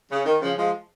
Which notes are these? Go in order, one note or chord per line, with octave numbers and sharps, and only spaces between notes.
C#3
D#3
C#3 F3
F3 G#3